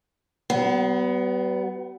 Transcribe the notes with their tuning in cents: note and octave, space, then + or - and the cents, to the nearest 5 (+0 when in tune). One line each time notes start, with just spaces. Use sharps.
G3 -45 B3 +10